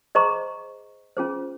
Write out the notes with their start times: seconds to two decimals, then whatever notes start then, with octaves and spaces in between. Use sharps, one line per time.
0.15 G#4 C5 D#5 A#5 C#6
1.17 C#4 F4 G#4 C5